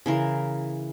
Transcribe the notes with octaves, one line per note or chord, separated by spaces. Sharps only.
C#3 E3 A#4